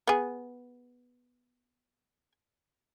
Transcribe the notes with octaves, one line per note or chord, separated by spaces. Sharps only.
B3 G#4